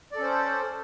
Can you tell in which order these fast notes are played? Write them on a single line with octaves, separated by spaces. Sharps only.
D5 A4 C#4 C5